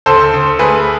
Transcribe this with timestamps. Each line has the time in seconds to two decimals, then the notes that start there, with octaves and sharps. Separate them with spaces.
0.06 D2 A4 C5
0.33 D2
0.59 A3 G#4 B4